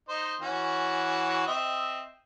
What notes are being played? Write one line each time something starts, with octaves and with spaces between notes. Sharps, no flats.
D#4 C5 D#5
E3 C#4 F#4
C4 D#5 E5